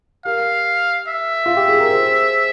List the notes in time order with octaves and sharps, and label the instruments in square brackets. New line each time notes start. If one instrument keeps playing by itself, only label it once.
[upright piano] G4 A#4 [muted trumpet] F5
[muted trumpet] E5
[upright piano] F4
G4
G#4
A#4
G#4 C5